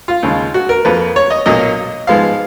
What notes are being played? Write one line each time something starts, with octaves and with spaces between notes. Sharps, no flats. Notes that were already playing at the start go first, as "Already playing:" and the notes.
F4
D#2 C#3 G#3
F#4
A#4
F2 F3 A#3 B4
C#5
D#5
B1 A#2 F#3 A#3 D#5
G#2 F3 G#3 B3 F5